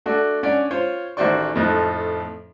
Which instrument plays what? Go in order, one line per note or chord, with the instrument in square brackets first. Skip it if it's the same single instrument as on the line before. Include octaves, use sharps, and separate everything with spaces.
[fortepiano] A3 D4 F#4 A4
C#4 D4 D5 F#5
F4 C5 C#5
A1 D#3 F#4 C5 D5 C#6
F2 A2 F3 D#4 F#6